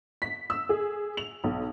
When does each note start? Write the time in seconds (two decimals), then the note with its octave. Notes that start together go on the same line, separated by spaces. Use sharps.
0.22 B6
0.50 E6
0.69 G#4
1.17 F7
1.44 B1